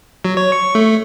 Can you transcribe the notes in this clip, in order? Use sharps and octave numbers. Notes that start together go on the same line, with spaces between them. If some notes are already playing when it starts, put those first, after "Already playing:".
F#3
C#5
C#6
A3